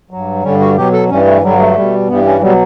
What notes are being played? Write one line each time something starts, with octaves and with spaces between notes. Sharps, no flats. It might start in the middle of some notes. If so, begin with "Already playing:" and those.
G2 F#3
G2 D3 G3 C#4
F#4
B2 F#3 G4
A4
G2 E3 G3 C#4
A3
G2 D3 F#3 G3
A3
B2 G3
G2 E3 G3 B3
C#4
B2 F#3 G3